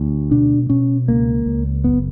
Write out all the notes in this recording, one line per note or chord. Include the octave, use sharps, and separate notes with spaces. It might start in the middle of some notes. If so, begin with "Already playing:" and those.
Already playing: D2
B2 D4
B2 C#4
C#2 A#3
C#2
F#1 B3